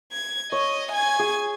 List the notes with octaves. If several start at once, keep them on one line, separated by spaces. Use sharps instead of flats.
G#6
C#5 D#5
G#5 G#6
G#4